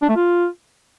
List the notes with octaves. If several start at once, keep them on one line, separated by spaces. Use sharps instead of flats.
D4
A3
F4